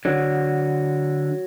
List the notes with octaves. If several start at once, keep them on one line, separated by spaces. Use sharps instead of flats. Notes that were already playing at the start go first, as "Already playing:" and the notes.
D3 F#3